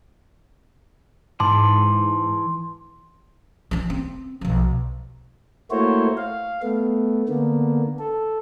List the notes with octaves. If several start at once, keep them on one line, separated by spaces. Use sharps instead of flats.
G#2 E3 A5 C6 D6
E3 D4
C4
B1 F3
A3 A#3 E4 F#4 C5 C#5
F5
A3 B3
D3 A#3 B3
A4